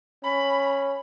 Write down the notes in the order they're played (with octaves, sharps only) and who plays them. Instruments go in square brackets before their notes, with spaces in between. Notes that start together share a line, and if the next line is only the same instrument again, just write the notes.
[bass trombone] C#4 [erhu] B5